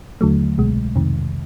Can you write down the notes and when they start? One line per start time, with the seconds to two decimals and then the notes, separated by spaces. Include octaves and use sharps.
0.21 D#2 D3 F#3 A3
0.58 C2 B2 G#3
0.95 F2 C3 D#3